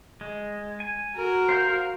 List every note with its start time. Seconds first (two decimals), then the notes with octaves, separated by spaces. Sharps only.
0.21 G#3
0.80 G#5
1.17 F#4 A#4
1.49 C5 F5 G6